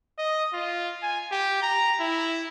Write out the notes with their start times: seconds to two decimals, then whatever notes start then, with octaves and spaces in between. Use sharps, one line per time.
0.18 D#5
0.53 F4
1.03 G#5
1.31 G4
1.62 A#5
2.00 E4